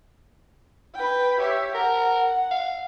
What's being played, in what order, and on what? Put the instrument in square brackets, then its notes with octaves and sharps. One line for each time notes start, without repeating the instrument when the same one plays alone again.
[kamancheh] B4 G5
[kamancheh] G4 E5 [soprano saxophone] C#5
[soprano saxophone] A#4 [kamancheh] F#5
[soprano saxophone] F5